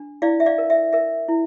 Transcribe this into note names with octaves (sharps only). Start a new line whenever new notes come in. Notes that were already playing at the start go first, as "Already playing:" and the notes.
Already playing: D4
E4 D5 F5
E5
D5 F5
A#4
E5
A#4 E5
E4